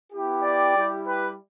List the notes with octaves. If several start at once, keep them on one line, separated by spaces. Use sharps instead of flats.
B3 E4 G4
D5 G5
G3 E4 G4
G4 B4